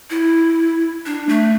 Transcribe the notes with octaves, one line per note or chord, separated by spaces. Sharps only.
E4
D4
A3